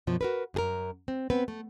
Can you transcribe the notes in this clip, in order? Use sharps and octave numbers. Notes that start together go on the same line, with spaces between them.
F#2 B2 F3
F#4 A#4 B4
F#2 G#4 A#4
C4
B3 C4 B4
A3